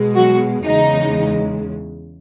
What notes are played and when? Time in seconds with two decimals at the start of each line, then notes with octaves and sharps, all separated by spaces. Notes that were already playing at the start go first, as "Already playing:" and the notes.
Already playing: B2 G#3
0.16 F#3 F#4
0.65 E2 C#3 G#3 D#4